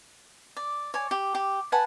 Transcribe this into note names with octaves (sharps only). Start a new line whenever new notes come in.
D5
C#5 D5 G#5
G4
G4
B4 F#5 G#5 A5